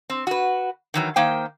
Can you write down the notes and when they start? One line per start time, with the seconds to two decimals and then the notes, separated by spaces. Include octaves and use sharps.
0.10 C4
0.27 F#4 B4
0.94 D#3 E3 F#3
1.16 D#3 A#3 C5 G5